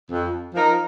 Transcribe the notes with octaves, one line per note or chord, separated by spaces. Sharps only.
F2
F3 D#4 A#4